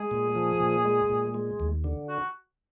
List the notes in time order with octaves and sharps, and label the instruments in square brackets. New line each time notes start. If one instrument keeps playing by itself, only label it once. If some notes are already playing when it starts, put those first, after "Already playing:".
Already playing: [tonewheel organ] G#3 [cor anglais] G#4
[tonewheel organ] A#2
F3
A#2
G#3
A#2
G#3
D#2
D3
[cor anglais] F#4